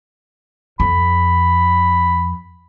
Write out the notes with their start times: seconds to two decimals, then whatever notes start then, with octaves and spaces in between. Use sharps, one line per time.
0.80 F2 B5